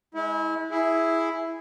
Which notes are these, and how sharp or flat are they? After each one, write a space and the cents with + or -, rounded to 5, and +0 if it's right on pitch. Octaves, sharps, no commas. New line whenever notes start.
G#3 +10 E4 -30
E4 +0 G#4 +0